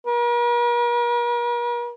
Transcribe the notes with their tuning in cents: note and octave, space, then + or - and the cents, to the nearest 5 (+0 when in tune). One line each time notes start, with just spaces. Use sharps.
A#4 +45